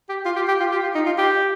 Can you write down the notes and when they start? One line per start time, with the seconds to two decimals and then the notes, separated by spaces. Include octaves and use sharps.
0.09 G4
0.25 F4
0.36 G4
0.48 G4
0.60 F4
0.71 G4
0.83 F4
0.95 D#4
1.06 F4
1.18 G4